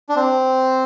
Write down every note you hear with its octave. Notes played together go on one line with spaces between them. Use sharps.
D4
C4